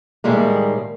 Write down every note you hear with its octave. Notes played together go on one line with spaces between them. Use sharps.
A2 D#3 G3 G#3 A#3